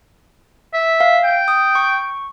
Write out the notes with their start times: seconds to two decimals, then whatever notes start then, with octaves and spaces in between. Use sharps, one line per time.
0.74 E5
1.00 F5
1.24 G5
1.48 D#6
1.75 C#6